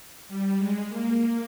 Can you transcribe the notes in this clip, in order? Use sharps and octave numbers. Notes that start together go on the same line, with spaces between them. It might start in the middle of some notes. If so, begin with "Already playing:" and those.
G3
G#3
A#3